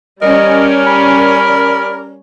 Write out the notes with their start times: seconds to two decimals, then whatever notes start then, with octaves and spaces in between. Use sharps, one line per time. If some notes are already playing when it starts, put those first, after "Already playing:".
0.22 G3 C#4 A#4 D5 D#5
0.87 B5